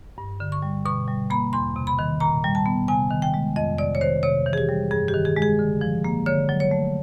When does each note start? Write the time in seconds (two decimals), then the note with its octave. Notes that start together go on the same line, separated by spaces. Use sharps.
0.18 G2
0.40 D3
0.52 C#6
0.62 G3
0.86 B2 C#6
1.08 G3
1.30 A#3 B5
1.53 E2 C6
1.76 C3
1.87 B5
1.99 D#3
2.20 A#2 A#5
2.44 G3
2.55 A5
2.66 B3
2.88 C3 G#5
3.10 D#3
3.22 G5
3.34 G#3
3.56 F2 D#5
3.78 C3 D5
3.95 C#5
4.01 D#3 C5
4.23 C3 C#5
4.46 E3
4.53 G#4
4.58 G4
4.69 G3
4.91 G2 G#4
5.08 G4
5.14 D#3
5.25 G#4
5.36 G#3
5.42 G#4
5.59 D3
5.81 F3
6.04 A#3
6.26 D3 C#5
6.49 F#3
6.60 C#5
6.71 A3